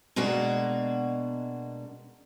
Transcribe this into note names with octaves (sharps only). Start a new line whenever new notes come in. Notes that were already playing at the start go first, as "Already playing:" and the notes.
B2 G#3 A#3 D4 F#4